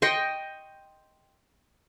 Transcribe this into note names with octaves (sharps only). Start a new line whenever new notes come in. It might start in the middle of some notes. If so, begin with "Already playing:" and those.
D#5 G5 C6 C#6